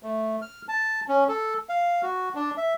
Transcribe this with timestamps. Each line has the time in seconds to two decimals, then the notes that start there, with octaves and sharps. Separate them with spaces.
0.03 A3
0.42 F6
0.68 A5
1.08 C#4
1.29 A4
1.69 F5
2.03 F#4
2.35 D4
2.57 E5